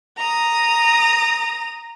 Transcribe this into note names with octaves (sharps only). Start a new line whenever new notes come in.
A#5 D#6